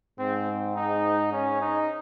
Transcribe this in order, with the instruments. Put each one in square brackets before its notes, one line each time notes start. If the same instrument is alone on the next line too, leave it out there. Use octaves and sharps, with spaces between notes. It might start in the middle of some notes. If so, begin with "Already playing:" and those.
[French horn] G#2 [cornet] C4
[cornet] D#4
C#4
D#4